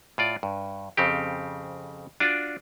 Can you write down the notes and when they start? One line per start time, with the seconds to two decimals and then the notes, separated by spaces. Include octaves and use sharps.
0.18 A2 F4 D5
0.43 G2
0.97 F2 C#3 C4 G4
2.20 D4 F4 F#4 D5